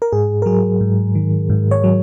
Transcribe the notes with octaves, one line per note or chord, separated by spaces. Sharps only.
A#4
G#2 G#4
A#4
F#3 G#4
G#2
D#3
G#2
C#5
F#3